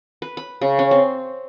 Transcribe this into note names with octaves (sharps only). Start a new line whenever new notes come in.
B4
B5
C#3
C#4
C4